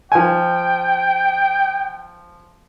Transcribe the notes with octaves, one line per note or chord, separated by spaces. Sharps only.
F3 G5 G#5